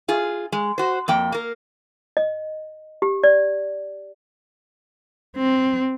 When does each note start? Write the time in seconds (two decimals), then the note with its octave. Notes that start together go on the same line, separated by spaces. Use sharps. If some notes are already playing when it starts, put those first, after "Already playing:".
0.08 F4 G#4
0.52 G#3
0.78 F#4 C5
1.08 F2 A#3 G5
1.32 A#3 A#4
2.17 D#5
3.02 G4
3.24 D5
5.36 C4